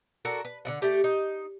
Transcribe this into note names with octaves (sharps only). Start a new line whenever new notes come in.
D4 F#4 A4 A#4
B4
D3 E4 F#5
A3 G4
D#4